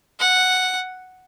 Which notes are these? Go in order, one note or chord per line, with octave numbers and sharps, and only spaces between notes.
F#5